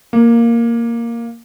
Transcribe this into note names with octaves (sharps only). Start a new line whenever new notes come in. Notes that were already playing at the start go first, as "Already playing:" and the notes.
A#3